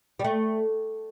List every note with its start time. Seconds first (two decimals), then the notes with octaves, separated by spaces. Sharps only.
0.19 G3
0.24 A3